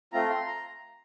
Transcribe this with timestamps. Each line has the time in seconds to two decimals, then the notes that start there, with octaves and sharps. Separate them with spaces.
0.13 A3 C4 F4 A#5
0.30 C6
0.47 A#5